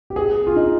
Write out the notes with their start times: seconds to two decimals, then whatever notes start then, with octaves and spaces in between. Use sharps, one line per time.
0.10 G4
0.16 G#4
0.47 F4
0.56 D#4